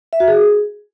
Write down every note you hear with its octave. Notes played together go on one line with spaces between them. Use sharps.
E5
F#4
G#4